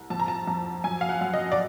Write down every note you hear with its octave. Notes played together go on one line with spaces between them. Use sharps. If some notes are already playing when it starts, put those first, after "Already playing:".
Already playing: C2
F2 A5
A#5
A5
F2
F#2 G#5
F5
F#5
F#2
D#5
D5